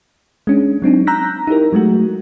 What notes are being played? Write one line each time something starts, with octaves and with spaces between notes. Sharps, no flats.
G#3 C#4 D4
F#3 C4 D4 D#4
A#5 E6 F#6 G6 A#6 B6
D#4 E4 G4 A#4
F#3 G#3 A3 F#4